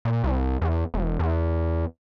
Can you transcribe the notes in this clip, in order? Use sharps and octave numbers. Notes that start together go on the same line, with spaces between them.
A#2
C2
E2
E1
E2